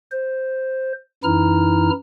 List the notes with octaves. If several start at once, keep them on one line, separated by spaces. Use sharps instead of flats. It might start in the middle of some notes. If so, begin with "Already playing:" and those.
C5
F#2 E3 D#4 E4 A#5 F6